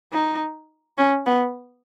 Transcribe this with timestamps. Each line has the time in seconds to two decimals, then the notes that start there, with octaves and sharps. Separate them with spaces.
0.13 D#4
0.98 C#4
1.26 B3